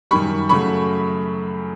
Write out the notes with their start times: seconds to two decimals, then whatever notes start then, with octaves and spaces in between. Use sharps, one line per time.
0.11 F#2 D#3 G3 B5 C#6
0.49 F#2 C#3 F#3 A3 B5 C#6